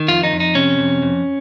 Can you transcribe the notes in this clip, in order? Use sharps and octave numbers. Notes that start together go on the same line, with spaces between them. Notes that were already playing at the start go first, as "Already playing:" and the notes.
Already playing: D#3
F2 F4
D#4
F2
D#4
C3 C#4
F2
F2